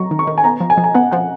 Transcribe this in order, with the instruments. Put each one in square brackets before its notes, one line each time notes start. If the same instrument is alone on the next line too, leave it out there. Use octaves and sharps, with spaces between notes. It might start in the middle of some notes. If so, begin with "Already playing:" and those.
Already playing: [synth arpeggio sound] F#3 [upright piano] A#5 C#6
[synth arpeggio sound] D#3
[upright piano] C#6
[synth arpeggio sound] D#3
[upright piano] G#5
[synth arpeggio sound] B3 [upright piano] A#5
[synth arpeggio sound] F3
[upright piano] G#5
[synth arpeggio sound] F3
[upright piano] G#5
[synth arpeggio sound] B3 [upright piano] F#5
[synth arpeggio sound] F3 [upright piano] F#5